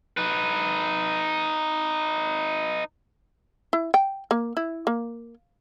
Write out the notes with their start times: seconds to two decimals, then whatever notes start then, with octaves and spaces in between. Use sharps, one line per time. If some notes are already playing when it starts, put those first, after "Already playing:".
0.17 D#4 B4
3.73 E4
3.94 G5
4.31 A#3
4.57 E4
4.87 A#3